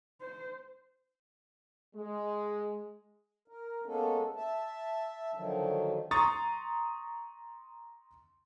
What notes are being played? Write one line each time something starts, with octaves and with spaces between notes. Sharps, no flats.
C5
G#3
A#4
G#3 A#3 B3 C#4 A4
E5 A5
D3 D#3 F3 F#3
A#5 C6 C#6 D#6 A6